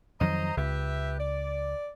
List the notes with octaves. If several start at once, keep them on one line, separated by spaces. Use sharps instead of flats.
F2 D#3 F#3 C5 D#5 A#5
C#2 G4 B4 E5
D5